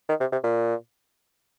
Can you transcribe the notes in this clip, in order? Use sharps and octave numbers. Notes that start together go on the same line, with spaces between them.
D#3
C3
C3
A#2